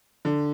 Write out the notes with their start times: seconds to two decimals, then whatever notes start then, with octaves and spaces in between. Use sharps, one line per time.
0.25 D3